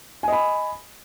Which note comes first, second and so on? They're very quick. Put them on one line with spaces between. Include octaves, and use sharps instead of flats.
G#5 D#5 B5